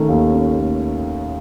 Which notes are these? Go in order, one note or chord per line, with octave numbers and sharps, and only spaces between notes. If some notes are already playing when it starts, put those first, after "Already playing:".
Already playing: D#3 A3 C#4
D#2
C#4
A3